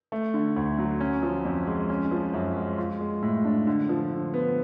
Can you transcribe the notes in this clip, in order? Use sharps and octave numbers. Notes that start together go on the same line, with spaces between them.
A3
D3
D2
F#3
C#4
F3
F2
G#3
C#4
F3
F#2
G#3
F4
G#3
A2
D4
D3
F3
D3
B3